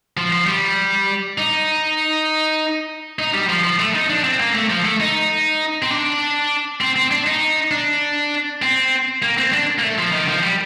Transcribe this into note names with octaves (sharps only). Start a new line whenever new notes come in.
F3
F3
G3
D#4
D#4
G3
F3
F3
A3
D#4
D4
C4
A#3
A3
F3
A3
D#4
C4
D4
C4
C4
D4
D#4
D4
C4
A#3
C4
D4
A#3
A3
F3
D#3
F3
G3